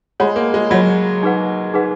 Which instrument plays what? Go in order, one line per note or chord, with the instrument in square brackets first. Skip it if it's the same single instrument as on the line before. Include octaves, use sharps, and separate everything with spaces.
[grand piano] G#3 [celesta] C#5 F#5 B5
[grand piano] A#3
G#3
[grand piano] F#3 [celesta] C#5 F#5 B5
[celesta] D#4 G#4 B4 F#5
D#4 G#4 B4 F#5